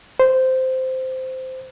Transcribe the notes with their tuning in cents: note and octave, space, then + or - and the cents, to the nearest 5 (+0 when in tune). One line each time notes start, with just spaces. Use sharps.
C5 -10